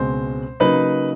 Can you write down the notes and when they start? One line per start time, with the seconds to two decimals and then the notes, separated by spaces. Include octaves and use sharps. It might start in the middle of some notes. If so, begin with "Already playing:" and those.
Already playing: C#2 B2 G#3 C4 C5
0.60 C#3 F#3 A#3 D#4 B4